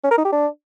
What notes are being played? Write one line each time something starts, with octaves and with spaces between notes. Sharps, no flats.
C#4
A#4
D#4
G4
D4